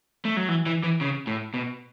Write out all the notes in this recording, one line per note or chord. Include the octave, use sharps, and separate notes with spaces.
A3
F#3
E3
E3
E3
C#3
A2
B2